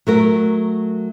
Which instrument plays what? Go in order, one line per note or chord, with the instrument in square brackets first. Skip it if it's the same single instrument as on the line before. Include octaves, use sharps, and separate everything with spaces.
[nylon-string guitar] F#3 A3 A#4